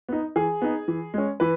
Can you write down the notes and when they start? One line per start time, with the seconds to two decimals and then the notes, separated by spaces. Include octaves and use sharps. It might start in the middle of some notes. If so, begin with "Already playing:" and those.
0.09 B3 D#4
0.36 E3 G#4
0.62 B3 D#4
0.88 E3
1.14 G#3 C#4
1.40 E3 B4